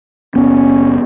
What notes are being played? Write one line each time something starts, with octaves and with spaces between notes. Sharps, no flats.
F#1 F2 B3 C#4